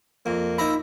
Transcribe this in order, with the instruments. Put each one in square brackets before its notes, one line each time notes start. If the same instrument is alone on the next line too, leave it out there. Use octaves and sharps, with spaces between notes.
[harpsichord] F2 [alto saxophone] A#3
[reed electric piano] D#4 B5 [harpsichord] C5 E5 A#5